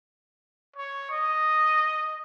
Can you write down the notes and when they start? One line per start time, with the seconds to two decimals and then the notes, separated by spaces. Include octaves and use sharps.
0.76 C#5
1.11 D#5